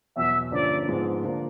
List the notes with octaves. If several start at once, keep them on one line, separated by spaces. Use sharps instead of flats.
E2 B2 F#3 E5
G2 D3 F3 A#3 C#4 D5
G#2 F3 G#3 B3
D3 F3 A#3 D4